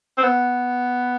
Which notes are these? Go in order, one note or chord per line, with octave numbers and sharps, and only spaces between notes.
C4
B3